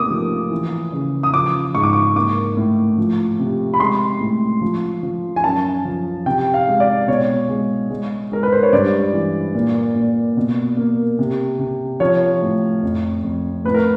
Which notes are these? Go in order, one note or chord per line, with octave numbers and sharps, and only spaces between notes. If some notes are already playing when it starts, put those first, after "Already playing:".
Already playing: C3 A3 A#3 D6 D#6
F3
E3
C#3
D#6
F3 D6
G#2 C#6
D6
C#6
A#3 D6
A2
F3
C3
B5
G#3 C6
A2
F3
F3
G#5
F#2 A5
F3
C3 G5
F5
G#3
D5
B2 C#5
G#3
G#3
G#3 A#4
B4
C5
C#5
G2 D5
E3
A#2
A#2
B2
A#3
C3
C3
F3 C#5
A2
F2
F2
A2 B4
A#4